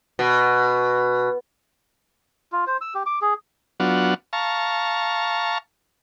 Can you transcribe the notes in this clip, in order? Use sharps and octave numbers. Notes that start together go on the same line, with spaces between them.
B2
F4
C5
E6
G4
D6
G#4
F#3 B3 D4 F4 F#4
F5 A5 A#5 C#6